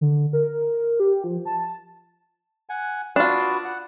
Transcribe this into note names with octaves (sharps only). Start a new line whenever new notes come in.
D3
A#4
G4
F3
A5
F#5 G#5
D4 F4 F#4 B4 D#6
F#5